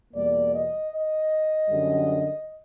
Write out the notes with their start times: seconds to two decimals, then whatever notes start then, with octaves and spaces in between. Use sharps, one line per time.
0.14 E2 B2 G3 A#3 D5
0.52 D#5
0.92 D#5
1.69 F#2 D3 G3